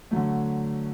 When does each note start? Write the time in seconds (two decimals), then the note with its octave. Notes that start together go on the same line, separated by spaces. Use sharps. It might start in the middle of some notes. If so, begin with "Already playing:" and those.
0.11 D3 F#3 A3